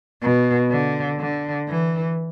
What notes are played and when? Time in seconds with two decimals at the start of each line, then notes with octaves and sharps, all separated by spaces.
0.22 B2
0.71 D3
1.19 D3
1.68 E3